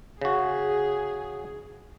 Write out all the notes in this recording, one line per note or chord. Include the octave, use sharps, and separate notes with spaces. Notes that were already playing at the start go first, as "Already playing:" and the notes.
C#3 F#4 G#4